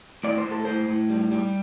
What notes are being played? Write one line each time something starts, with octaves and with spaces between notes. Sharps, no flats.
A2 D5
C5
A2
A4
A2 C5
A2
G3
G3